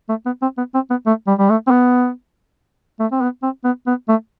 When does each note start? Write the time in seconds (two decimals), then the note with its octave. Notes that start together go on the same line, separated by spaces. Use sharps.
0.09 A3
0.26 B3
0.42 C4
0.57 B3
0.74 C4
0.90 B3
1.06 A3
1.27 G3
1.39 G3
1.50 A3
1.67 C4
1.71 B3
3.00 A3
3.12 C4
3.22 B3
3.43 C4
3.64 B3
3.87 B3
4.09 A3